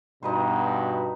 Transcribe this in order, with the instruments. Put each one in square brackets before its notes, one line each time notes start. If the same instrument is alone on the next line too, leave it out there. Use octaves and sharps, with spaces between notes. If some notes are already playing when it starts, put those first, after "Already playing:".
[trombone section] G2 B2 [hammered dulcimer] D#4 B4 C5